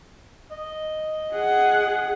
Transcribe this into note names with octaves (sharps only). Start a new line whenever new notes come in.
D#5
G#4 F#5